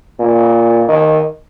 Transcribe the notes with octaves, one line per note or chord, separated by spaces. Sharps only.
A#2
D#3